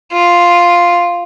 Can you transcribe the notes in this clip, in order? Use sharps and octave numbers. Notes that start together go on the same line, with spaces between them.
F4